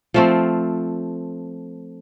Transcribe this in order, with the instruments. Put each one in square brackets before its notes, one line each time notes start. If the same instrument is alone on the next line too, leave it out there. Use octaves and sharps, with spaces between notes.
[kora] F3 A3 C4